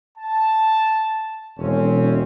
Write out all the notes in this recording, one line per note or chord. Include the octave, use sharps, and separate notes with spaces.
A5
E1 C4 C#4